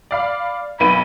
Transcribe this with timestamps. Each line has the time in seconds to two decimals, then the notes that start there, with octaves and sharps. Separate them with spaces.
0.11 D5 F5 B5
0.80 B1 B3 B5 D#7